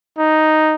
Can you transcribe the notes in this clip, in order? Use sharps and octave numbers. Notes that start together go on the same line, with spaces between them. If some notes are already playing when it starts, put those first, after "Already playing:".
D#4